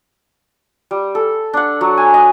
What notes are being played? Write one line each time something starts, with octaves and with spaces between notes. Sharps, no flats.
G3
A4
D4 F#5
F#3
G#5
D#5